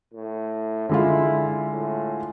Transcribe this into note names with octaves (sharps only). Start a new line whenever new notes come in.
A2
D3 G#3 E4 F4
A2